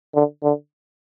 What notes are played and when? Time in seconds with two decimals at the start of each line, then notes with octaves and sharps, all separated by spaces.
0.15 D3
0.43 D3